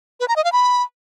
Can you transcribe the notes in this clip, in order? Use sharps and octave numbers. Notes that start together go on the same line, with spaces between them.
B4
A#5
D#5
F5
B5